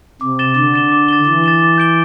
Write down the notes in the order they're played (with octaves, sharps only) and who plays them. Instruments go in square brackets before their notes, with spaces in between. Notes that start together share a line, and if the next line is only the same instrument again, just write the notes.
[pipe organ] C3 [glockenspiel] D6
[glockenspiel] A6 E7 G7
[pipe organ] D3 [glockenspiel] D6
[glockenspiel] A6 E7 G7
D6
A6 E7 G7
[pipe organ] E3 [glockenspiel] D6
[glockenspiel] A6 E7 G7
D6
G6 D7 G7